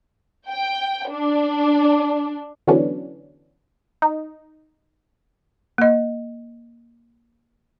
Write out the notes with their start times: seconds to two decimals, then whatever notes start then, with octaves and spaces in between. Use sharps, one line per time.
0.49 G5
1.10 D4
2.67 D3 E3 F#3 B3 C#4 D4
4.02 D#4
5.78 A#3 D#5